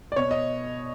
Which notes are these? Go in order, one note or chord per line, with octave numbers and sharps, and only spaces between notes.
D5
B2 C#5
D#5